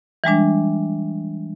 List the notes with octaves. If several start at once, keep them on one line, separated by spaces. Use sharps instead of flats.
E3 G3 G#3 D4